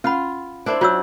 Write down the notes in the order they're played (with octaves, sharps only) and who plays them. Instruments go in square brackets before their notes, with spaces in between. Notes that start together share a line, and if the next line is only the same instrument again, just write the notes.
[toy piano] C#4 F#5 B5 [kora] F4
[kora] D4 E4 C5
[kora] F#3 [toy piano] F4 C#5 E6